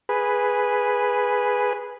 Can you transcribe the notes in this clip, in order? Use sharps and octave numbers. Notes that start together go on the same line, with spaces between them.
G#4 B4